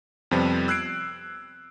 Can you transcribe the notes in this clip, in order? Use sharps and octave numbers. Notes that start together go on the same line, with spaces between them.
F2 C3 F3 G3 B3
E6 F#6 G#6 C7 D7